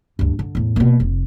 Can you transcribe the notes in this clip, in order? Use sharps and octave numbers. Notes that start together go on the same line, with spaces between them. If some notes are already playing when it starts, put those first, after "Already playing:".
D2 G2
D3
E2 A2
B2 A#3
F1